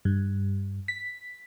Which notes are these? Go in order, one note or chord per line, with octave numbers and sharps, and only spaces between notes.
G2
B6